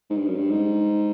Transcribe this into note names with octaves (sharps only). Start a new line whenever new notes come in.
G#2
G2
F#2
G2
G#2